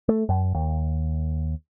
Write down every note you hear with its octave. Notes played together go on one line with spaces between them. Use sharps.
A3
F#2
D#2